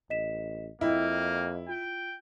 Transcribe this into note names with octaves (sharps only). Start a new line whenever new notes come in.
A1 D#5 B6 E7
F2 A#3 E4 D#5 G5
F4 G5